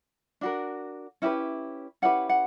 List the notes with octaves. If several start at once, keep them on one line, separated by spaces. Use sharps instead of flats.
D4 F#4 A#4
C#4 E4 G4 B4
C#4 E4 G4 B4 F#5
F#5